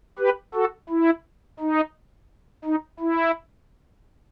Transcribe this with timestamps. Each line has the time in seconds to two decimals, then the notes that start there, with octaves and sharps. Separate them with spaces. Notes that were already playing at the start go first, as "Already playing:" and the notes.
0.19 G4 B4
0.54 F#4 A4
0.90 E4
1.60 D#4
2.65 D#4
3.00 E4